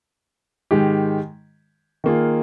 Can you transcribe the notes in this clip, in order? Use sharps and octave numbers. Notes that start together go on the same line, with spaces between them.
G#2 D#3 G#3 D#4 G4
D#3 A#3 F4 G#4